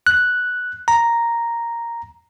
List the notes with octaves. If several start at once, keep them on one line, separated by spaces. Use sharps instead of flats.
F#6
A#5